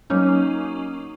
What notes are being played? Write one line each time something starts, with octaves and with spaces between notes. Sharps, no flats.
F#3 A#3 C#4 D#4